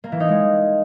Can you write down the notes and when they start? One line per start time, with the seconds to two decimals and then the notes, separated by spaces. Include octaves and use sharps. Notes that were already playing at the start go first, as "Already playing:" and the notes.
0.04 A#3
0.12 E3
0.20 D#4
0.28 G#3